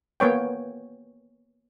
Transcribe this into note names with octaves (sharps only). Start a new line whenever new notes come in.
A#3 B3 C#5 G5